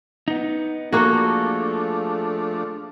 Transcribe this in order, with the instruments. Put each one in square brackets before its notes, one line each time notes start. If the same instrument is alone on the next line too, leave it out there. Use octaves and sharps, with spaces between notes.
[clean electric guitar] B3 D#4
[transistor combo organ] F3 A3 D4 [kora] A#3 F#4 [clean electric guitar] G#4 A4